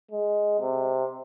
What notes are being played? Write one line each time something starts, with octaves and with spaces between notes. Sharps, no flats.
G#3
C3